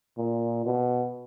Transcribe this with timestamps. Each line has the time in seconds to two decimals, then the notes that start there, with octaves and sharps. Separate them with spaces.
0.18 A#2
0.66 B2